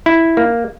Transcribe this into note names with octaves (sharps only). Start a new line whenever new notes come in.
E4
A#3